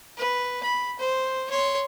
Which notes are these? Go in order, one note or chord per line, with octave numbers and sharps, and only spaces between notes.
B4
B5
C5
C#5 C6